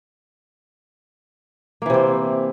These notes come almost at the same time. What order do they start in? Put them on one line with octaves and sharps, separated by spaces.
A#3 E3 C3 C4